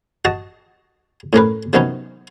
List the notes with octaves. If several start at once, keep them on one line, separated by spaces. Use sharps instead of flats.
F#4 D#5 A5
A2 C#4 A#4 B4
C3 D#3 F#3 B3 C#4 D#4